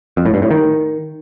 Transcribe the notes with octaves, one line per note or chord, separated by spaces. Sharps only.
F2
A2
G2
A2
D#3